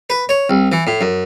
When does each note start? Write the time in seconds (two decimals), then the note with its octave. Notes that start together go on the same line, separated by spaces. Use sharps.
0.10 B4
0.29 C#5
0.50 C2
0.72 E3
0.87 A2
1.01 F#2